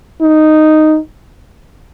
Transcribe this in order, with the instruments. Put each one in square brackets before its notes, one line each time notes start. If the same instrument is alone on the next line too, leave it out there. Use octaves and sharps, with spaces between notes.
[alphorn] D#4